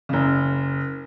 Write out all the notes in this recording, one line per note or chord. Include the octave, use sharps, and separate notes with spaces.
F#1 C#3